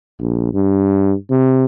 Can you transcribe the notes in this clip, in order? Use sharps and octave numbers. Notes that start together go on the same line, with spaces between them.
A#1
G2
C3